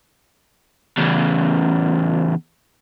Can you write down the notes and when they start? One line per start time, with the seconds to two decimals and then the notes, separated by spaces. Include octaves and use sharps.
0.97 E2 C#3